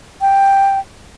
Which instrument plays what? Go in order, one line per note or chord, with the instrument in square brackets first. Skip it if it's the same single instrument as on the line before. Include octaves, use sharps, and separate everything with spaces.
[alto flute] G5